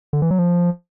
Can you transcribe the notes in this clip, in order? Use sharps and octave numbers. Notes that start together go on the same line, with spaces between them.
D3
E3
F#3
F3